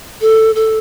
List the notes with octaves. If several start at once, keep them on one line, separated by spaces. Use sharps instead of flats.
A4
A4